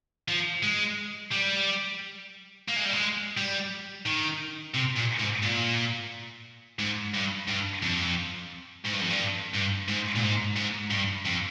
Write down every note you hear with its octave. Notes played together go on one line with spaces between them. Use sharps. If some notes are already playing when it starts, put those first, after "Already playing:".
F3
G#3
G3
A#3
G#3
G3
G#3
G3
D#3
C3
A#2
G#2
A#2
G#2
G2
G2
F2
G#2
G2
F2
G2
G2
G#2
A#2
G#2
G#2
G2
F2